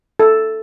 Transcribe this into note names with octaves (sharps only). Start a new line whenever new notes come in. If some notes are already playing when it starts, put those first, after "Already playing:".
A4